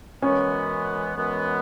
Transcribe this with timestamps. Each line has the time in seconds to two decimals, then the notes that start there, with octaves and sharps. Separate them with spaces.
0.22 F#2 E3 G#3 B3 C#4
1.15 F#2 E3 G#3 B3